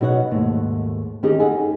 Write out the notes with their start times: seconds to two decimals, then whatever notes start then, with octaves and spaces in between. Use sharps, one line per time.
0.01 B2 F#3 D#4 C#5 D5 F#5
0.31 D#2 G#2 A3
1.23 D#3 C#4 D#4 G4 G#4
1.40 F#2 D#4 G#4 A4 F#5 G#5